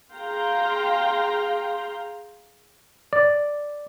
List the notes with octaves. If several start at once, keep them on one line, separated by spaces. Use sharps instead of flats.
G#4 F5 G5 A#5 C6
D5